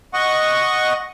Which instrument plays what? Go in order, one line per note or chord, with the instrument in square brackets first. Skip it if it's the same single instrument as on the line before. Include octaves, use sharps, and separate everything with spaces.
[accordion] D#5 F#5 C#6